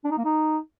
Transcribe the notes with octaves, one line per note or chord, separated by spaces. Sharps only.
D4
D#4
A#3
D#4